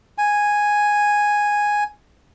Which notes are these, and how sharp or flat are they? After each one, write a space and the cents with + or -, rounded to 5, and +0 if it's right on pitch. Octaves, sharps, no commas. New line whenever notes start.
G#5 -5